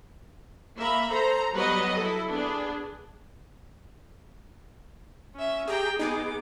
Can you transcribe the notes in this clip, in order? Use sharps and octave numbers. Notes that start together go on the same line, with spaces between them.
A#3 E5 A#5 B5
A4 C5 A#5
F#3 G3 B3 B4 D#5
E4 A4
B3 D4 G#4
C#4 E5
G4 G#4 G5 A#5
B3 D#4 G#4 D6